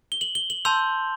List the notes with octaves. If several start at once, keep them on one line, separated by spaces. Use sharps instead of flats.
G7
F#7
G7
F#7
A5 C6 E6 G6 F7